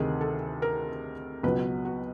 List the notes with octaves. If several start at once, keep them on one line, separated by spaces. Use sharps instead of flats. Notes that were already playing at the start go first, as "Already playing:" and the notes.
Already playing: D2 C3 D#3 G#4
A4
A#4
C#2 B2 F#3 B4
F#4